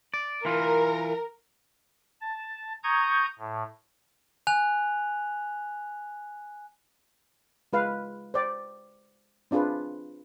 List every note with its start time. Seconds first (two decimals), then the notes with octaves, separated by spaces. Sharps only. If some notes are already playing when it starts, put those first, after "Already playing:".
0.14 D5
0.45 E3 F4 A#4
2.21 A5
2.84 A#5 C#6 D#6 G6 G#6
3.39 A2
4.47 G#5 F#6 F7
7.73 G#3 F4 B4 F5
8.34 C5 D5 G5
9.51 C4 D4 F4 G#4 B4